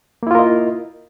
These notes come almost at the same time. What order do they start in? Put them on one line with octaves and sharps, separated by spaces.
A#3 E4 F4 A#4 D#5